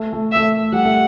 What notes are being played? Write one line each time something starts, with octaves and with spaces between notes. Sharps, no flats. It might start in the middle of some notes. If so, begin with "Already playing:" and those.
Already playing: A3
A3
A3 E5
G3 F#5
A3